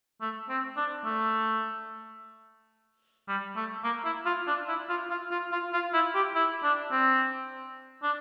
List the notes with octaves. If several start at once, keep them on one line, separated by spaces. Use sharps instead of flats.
A3
C4
D4
A3
G3
A3
A#3
E4
F4
D4
E4
F4
F4
F4
F4
F4
E4
G4
E4
D4
C4
D4